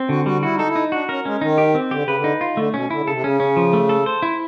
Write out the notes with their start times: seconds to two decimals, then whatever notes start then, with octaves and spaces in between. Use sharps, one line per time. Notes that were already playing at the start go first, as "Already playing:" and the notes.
Already playing: C4
0.09 D3 F#4
0.26 G3 F#4
0.43 E4 F#4
0.55 D#4 A4
0.68 E4
0.76 D#4
0.92 D4 F#4
1.09 C#4 A#4
1.25 G#3 C#4
1.41 D#3 D#4
1.58 G4
1.75 C4
1.91 D3 G4
2.04 C#3 B4
2.16 D3
2.24 D#4
2.41 F4
2.57 D3 A3
2.74 B2 C#4
2.91 D3 E4
3.01 C#3
3.07 C3 A4
3.22 C#3 C#4
3.40 C#4
3.57 F3
3.73 A3
3.89 A4
4.06 C5
4.22 E4